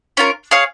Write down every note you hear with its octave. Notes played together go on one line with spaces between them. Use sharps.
C#4 F4 A#4
G#4 C#5 F5